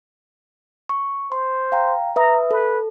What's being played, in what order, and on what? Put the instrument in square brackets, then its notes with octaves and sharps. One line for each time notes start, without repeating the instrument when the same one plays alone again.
[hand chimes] C#6
[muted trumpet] C5 [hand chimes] C6
[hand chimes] F5 G5 A#5
[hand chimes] B4 E5 D#6 [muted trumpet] A#5
[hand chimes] A4 [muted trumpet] B4